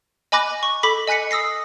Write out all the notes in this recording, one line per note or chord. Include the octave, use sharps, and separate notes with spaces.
D#5 G#5 B5 D6 F#6 A#6
C#6
A4 B5 D6 B6 F#7
D#5 G#5 F#6 B6 C#7
D#6 E6 A#6 C7